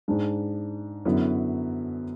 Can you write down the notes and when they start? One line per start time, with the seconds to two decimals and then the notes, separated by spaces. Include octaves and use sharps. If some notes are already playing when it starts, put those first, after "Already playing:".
0.08 G#2 G#3 D4
1.05 F#2 D3 F#3 B3 E4